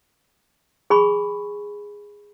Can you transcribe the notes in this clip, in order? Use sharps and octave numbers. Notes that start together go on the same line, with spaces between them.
G#4 G#5 B5 C#6